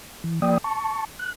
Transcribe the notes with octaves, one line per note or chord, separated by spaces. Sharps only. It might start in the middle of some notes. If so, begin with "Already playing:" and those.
E3
F3 A#3 D5 G5 D#6
A5 C#6
F#6